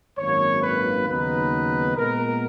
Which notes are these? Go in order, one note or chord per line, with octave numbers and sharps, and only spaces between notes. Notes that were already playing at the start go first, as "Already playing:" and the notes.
G#1 F#2 D#3 A#3 C#5
B4
D#2 C#3 F#3 B3 D#4 B4
A#2 G#3 B3 A#4